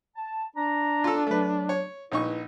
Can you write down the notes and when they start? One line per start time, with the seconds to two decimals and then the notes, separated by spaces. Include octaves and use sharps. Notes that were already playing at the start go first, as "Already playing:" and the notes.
0.16 A5
0.56 D4 A#5
1.04 F4 A4
1.27 F#3 A3 B4
1.69 C#5
2.12 A#1 D#4 E4 B4 C#6